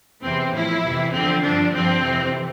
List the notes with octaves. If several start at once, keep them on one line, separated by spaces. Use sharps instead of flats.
E2 C3 E3 C4
A2 F3 E4
F2 C3 E3
E2 D3 F3 C4
G2 D3 F3 D4
G2 D3 F3 C4
F2 C3 E3